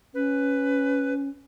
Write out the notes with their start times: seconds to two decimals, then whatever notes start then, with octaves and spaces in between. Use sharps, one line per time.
0.14 C#4 B4